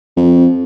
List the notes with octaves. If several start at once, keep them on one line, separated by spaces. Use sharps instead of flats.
F2